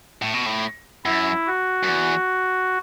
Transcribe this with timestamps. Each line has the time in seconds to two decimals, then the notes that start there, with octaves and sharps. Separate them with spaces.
0.22 A2
0.34 B2
0.46 A2
1.05 F#2 E4
1.47 F#4
1.83 F#2
1.88 E2